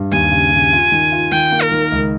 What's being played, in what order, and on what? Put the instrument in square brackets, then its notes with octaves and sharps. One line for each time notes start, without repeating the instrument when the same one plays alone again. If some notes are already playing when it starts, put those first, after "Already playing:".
Already playing: [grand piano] G2
[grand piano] D#2 [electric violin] G#5
[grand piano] C#3
C#3
F4
D#3
F4
[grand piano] D#3 [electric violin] G5
[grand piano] A#3
[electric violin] A#4
[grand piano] D#3
C#2